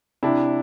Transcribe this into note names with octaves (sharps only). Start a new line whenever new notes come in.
C3 D4 E4